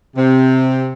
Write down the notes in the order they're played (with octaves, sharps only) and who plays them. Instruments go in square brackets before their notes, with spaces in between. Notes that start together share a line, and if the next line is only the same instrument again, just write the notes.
[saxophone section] C3